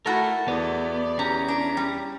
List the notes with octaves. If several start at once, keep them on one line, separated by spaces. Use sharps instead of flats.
A3 E4 F#4 A4 A#4 A5
E2 B3 D5
C#4 G4 A#5
D4
G3